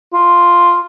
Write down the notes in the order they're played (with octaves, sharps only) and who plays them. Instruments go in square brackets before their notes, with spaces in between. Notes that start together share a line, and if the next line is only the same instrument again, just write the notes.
[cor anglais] F4